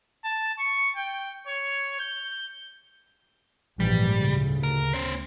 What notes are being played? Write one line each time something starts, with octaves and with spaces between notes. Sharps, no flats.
A5
C#6
G5
C#5
G6
A#1 G#2 E3 G3
D2 C#3
A#4
C#4 C5